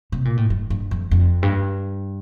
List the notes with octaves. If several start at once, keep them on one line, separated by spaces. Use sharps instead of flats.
C3
A#2
A2
G2
G2
F2
F2
G2